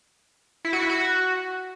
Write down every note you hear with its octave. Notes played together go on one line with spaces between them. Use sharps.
E4
F#4
E4
F#4